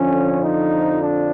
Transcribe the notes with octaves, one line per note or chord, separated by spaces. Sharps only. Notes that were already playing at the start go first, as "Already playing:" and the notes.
Already playing: F2 D3 F3 C#4
D#4
D4